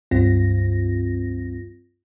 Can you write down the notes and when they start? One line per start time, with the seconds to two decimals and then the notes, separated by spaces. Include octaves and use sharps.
0.11 C#2 G2 C4 F4 A#6